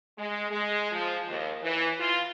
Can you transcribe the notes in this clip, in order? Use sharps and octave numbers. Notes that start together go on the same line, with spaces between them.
G#3
G#3
F3
D#2
E3
F4